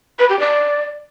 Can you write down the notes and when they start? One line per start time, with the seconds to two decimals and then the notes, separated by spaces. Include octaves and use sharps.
0.19 B4
0.29 G4
0.40 D5